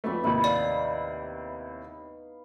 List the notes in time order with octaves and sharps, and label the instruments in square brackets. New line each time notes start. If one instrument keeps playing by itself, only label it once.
[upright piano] F2 A3 [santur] B3 D5 E5
[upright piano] D#2 A2 C3 [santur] D#4 E4 B5
[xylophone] D5 [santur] F5